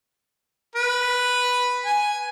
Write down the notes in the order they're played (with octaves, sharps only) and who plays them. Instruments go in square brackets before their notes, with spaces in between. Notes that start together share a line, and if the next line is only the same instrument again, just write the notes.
[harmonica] B4
G#5